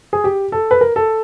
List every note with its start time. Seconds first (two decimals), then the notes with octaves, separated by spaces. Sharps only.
0.13 G#4
0.24 G4
0.52 A4
0.71 B4
0.81 A#4
0.96 A4